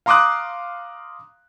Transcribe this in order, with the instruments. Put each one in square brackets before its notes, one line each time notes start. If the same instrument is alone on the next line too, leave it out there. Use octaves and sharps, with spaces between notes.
[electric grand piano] F5 A#5 C6 D6 D#6 F#6